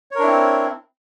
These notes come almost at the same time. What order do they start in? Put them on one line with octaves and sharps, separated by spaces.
C#5 A#4 D4 E4 C4